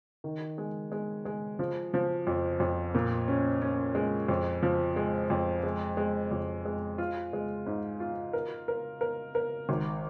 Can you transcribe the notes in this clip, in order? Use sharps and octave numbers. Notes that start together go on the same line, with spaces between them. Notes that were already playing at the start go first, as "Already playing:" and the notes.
D#3
G#3
G#3
G#3
F3
F3
F2
F2
A#2
C#4
C#4
G#3
F2
F3
G#3
F2
G#3
G#3
F2
G#3
F4
G#3
G#2
F4
A#4
A#4
A#4
A#4
G#1